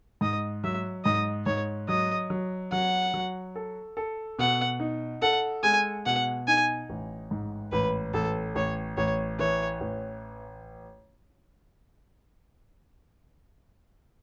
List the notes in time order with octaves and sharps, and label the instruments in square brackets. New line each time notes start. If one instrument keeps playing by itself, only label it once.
[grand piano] G#2 [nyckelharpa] D#5
[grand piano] F#3 [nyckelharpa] E5
[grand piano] G#2 [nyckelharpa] D#5
[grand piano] G#2 [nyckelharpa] C#5
[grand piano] F#3 [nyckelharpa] D#5
[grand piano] F#3
[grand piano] F#3 [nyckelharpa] F#5
[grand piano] F#3
A4
A4
[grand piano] B2 [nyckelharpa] F#5
[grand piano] D#4
[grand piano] A4 [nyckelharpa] F#5
[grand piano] G#3 [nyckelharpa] G#5
[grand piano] B2 [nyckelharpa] F#5
[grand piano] D#4 [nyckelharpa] G#5
[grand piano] A1
G#2
[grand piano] A1 [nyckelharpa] B4
[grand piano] A1 [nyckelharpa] A4
[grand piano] A1 [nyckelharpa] C#5
[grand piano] A1 [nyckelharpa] C#5
[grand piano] E3 [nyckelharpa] C#5
[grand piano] A1